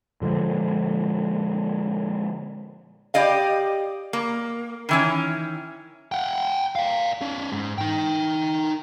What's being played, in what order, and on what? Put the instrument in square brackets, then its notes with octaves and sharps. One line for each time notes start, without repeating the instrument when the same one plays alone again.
[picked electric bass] A#2 D3 F3 G#3
[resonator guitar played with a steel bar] G4 D5 D#5 F5
A#3
D#3 E3 C#4
[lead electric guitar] F#5 G5
D5 F5
C#4 D5
G#2
D#4 G5